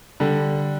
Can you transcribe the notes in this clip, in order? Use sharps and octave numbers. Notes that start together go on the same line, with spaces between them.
D3 G3